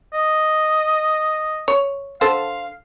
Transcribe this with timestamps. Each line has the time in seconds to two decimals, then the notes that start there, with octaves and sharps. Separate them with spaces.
0.13 D#5
1.68 C#5
2.21 D3 A4 C5 F5